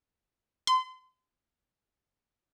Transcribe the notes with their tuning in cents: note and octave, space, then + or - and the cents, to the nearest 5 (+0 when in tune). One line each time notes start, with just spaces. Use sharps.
C6 -35